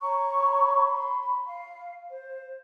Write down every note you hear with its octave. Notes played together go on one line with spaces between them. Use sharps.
C#5 A#5 B5 C#6
B5 C6
F5
C5